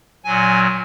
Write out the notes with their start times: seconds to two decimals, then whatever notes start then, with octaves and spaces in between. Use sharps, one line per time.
0.24 A#2 F#3 G#5